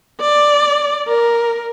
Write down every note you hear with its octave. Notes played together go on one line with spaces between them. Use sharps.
D5
A#4